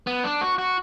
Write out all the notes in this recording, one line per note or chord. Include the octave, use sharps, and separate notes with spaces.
B3
D4
F#4
F#4